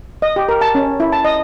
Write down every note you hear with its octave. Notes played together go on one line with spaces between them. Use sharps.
D#5
G4
A#4
A5
C#4
E4
A5
D#5